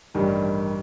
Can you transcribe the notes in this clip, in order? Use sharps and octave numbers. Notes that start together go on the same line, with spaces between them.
A1 G2 D#3 G3